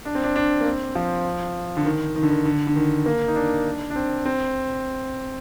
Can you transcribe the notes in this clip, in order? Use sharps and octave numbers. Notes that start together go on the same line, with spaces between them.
D4
C4
D4
D4
A#3
C4
F3
D3
D#3
D#3
D3
D#3
D3
D3
D#3
A#3
D#4
D4
D4
C4
C4